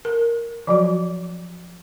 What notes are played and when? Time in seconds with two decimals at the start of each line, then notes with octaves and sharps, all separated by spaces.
0.05 A#4
0.67 F3 F#3 F#4